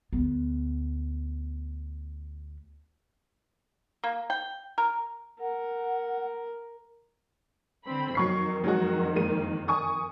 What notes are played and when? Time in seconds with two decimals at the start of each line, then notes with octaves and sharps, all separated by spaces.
0.13 D2 B3
4.04 A#3
4.30 G5
4.78 A#4
5.40 A#4 F#5
7.85 D3 C4 B5
8.15 F2 D#3 F#3 C#6 C7
8.64 F#3 G#3 F#4
9.15 G#3 A#3 D#7
9.68 G#5 C#6 D#6